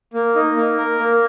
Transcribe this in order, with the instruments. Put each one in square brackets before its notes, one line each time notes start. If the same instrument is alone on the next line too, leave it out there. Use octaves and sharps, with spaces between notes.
[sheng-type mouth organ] A#3
D#4
A#3
A#4
A#3